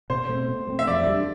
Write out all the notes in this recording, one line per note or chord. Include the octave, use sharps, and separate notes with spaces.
B2 C5
A3 C4
B2
A3 C4
E5
F2 D5
D3 G3 D4